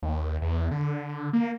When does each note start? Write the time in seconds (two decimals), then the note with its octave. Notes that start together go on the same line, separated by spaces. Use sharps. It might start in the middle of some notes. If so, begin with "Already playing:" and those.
0.02 D#2
0.42 E2
0.71 D3
1.33 A#3